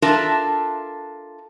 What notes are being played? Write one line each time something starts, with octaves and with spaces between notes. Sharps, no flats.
D4 F4 A4 A#4 E5 A5